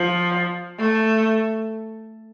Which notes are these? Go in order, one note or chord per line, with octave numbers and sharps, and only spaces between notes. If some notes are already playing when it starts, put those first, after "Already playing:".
Already playing: F3
A3